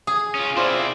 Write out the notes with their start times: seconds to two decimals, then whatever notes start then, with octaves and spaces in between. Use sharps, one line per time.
0.07 G#4
0.35 C#4 F4
0.57 C4 E4 F4 C5 D5